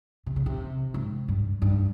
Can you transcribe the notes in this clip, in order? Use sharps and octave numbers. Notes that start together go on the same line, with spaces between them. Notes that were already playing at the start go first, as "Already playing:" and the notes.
C3
C#3
C3
G#2
G2
G2